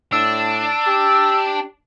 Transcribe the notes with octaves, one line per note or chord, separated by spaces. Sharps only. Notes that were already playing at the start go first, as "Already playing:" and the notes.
A2 D4 E6
G4